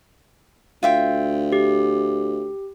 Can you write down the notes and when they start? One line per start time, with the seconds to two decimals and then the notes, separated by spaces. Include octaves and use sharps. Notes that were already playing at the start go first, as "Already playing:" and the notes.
0.83 D2 F4 E5 G5
1.52 G4